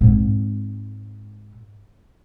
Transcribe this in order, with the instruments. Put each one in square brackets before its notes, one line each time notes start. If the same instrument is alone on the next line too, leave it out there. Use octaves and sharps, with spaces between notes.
[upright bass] G#2 C4